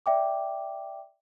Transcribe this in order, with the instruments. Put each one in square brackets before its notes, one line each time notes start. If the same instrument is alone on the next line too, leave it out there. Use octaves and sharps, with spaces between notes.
[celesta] D5 E5 G5 D6